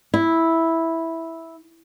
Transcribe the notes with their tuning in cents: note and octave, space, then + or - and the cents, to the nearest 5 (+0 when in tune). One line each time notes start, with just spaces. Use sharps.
E4 -5